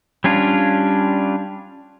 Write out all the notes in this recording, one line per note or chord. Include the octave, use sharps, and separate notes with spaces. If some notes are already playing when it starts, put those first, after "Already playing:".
G3 C#4 D4 F4